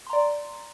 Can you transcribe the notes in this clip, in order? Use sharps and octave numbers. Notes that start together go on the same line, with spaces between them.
D5 A#5 C6